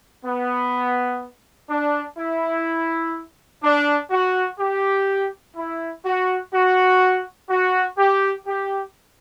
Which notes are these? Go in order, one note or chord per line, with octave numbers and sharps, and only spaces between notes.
B3
D4
E4
D4
F#4
G4
E4
F#4
F#4
F#4
G4
G4